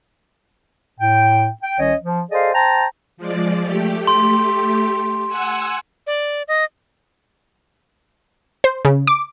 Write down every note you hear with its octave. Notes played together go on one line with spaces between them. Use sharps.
A2 G5
G5
C2 D#3 C#4 C#5 D#5
F3
G#4 A4 C5 D5 D#5 F5
C5 G5 A5 A#5
F3 G#3 D5
A3 G4
C6
F#5 G#5 E6
D5
D#5
C5
C#3
D6